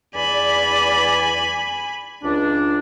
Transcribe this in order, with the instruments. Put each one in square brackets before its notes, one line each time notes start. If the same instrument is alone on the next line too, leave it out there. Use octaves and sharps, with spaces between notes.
[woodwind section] E2 D5 [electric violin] G#5 B5
[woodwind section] C#2 D4